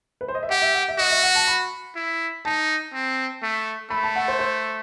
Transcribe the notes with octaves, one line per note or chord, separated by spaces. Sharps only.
B4
C5
D#5
E5
G4 F#5
E5
F#5
E5
F#4 D#5
E5
F#5
A5
B5
E4
D#4 A5
C4
A3
A3 B5
A5
F#5
C5
C5